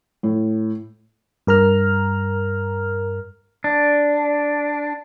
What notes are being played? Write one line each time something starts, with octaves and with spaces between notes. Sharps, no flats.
A2
G2 A#4 A#5 F6
D4